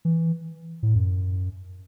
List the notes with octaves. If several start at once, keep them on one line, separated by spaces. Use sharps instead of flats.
E3
A2
F#2